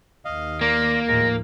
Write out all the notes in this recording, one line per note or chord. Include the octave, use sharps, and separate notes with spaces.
D#2 D#5 F5
A#3 A#4 D5 C6 A#6
D#2 A2 F3 G#3 A#4 A#6